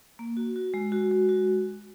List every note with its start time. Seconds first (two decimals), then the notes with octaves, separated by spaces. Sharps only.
0.19 A#3
0.37 F#4
0.56 F#4
0.74 G#3
0.92 F#4
1.11 G#3
1.29 F#4